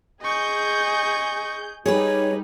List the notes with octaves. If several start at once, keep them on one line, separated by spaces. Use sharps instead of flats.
G#4 D#5 C#6 G6
G3 D#4 G#4 B4 C#5